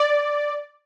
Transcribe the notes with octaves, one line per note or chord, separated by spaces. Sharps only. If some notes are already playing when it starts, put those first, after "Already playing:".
Already playing: D5